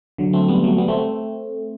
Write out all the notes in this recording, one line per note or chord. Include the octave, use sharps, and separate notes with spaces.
D3 F#3
A3 C4
G3 B3
F#3 A3
G3 B3
A3 C4